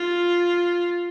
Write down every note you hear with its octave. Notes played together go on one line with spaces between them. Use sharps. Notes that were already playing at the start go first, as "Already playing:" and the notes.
Already playing: F4